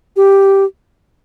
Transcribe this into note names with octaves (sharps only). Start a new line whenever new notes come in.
G4